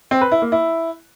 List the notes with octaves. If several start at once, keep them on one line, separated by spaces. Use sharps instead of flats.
C4
B4
E4
A#3
E4